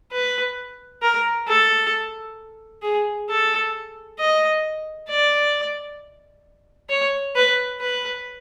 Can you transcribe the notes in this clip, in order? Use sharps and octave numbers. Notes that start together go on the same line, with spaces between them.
B4
A#4
A4
G#4
A4
D#5
D5
C#5
B4
B4